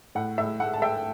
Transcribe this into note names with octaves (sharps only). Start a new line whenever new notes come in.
A2 F#5
A2 E5
A3 F#5
A5
A3 E5 G5